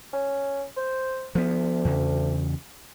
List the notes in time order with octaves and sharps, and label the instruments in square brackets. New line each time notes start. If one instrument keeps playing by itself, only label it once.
[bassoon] C#4
C5
[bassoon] D2 [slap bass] F3 B3
[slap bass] E2 C#3